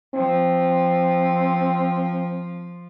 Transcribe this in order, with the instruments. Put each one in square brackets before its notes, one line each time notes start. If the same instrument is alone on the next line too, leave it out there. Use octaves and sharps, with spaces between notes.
[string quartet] F3 [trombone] C4